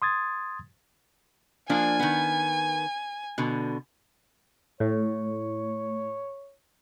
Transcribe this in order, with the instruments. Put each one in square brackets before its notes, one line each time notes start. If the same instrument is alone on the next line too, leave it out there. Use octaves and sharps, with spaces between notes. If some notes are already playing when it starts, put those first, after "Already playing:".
[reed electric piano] C6 D#6 G#6 A6
[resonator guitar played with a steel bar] F3 A#3 D4 [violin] G#5
[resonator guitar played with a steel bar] D#3 B3
B2 D3
[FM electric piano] A2 [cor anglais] C#5